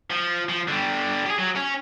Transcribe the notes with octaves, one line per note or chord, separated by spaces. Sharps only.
F3
F3
D3 G3
G4 G#4
F#3
C#4